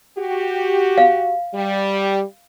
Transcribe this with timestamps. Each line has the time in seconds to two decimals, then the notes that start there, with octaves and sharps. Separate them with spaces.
0.18 F#4 G4
0.98 F5
1.54 G3